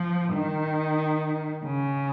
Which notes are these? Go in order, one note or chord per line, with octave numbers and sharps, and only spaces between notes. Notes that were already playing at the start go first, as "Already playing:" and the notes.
Already playing: F3
D#3
C#3